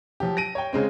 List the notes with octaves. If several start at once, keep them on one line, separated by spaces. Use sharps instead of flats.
F3 F#3 G4
A#6 D7 D#7
C#5 G5
C#3 G#3 C4